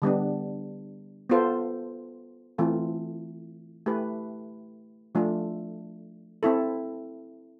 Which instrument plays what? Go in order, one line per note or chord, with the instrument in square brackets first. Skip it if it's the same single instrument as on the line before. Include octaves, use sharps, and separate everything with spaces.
[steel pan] D3 G3 B3 D4
B3 F4 A4 C5
E3 A3 C4 F4
A3 E4 G4 B4
F3 A3 D4 F4
C4 E4 A4